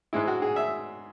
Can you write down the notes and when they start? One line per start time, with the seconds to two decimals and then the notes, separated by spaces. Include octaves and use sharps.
0.13 G#2 G#3 E4
0.28 F#4
0.42 G#4
0.56 E5